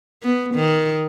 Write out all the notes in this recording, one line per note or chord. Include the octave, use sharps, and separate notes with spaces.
B3
D#3